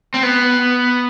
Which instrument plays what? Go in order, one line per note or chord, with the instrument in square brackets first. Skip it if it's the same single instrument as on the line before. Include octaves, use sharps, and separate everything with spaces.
[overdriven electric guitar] C4
B3